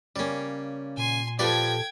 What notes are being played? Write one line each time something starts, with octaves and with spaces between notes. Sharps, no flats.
C#3 G3 A#3 C#4
A#2 G#5 C6
F3 G4 A4 B4 D5 G5 G#6